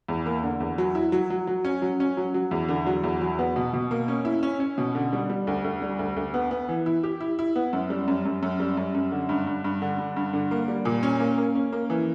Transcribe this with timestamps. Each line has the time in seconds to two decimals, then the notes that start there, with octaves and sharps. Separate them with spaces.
0.09 E2
0.26 A#3
0.43 D3
0.60 E2
0.78 F#3
0.95 E4
1.12 F#3
1.30 F#3
1.47 F#3
1.65 C#4
1.82 F#3
2.00 C#4
2.17 F#3
2.34 F#3
2.51 E2
2.69 D3
2.87 F#3
3.04 E2
3.21 F#3
3.39 B3
3.56 B2
3.73 B2
3.91 A#3
4.08 C#4
4.25 E4
4.43 C#4
4.60 C#4
4.78 B2
4.95 D3
5.13 G3
5.30 G3
5.47 D2
5.64 D2
5.82 G3
5.99 D2
6.16 D2
6.34 B3
6.51 B3
6.69 E3
6.86 E4
7.03 G4
7.21 E4
7.39 E4
7.56 B3
7.73 F#2
7.90 G3
8.08 F#2
8.25 F#2
8.43 F#2
8.60 G3
8.77 F#2
8.95 F#2
9.12 D3
9.29 G2
9.47 G2
9.64 G2
9.82 D3
9.98 G2
10.16 G2
10.33 D3
10.51 A#3
10.68 G3
10.85 A#2
11.03 C#4
11.20 A#3
11.38 A#3
11.55 C#4
11.72 A#3
11.90 E3